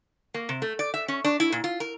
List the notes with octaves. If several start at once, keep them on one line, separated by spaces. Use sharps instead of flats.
A#3
C3
A3
D5
E5
C#4
D4
E4
A#2
F4
A#4